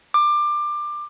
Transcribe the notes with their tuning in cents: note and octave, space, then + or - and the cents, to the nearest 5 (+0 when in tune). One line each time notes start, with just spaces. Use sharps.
D6 +20